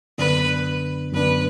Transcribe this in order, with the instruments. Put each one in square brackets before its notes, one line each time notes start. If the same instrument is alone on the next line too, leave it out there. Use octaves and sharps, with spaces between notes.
[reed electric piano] F#2 D3 B3 D4 [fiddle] B4
[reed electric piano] F#2 D3 B3 D4 [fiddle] B4